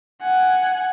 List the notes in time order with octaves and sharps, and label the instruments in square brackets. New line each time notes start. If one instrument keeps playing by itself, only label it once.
[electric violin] F#5 G#5